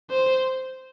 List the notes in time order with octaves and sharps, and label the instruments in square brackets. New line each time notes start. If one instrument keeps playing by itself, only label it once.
[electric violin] C5